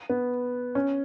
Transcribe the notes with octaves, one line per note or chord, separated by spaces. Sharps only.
B3
C#4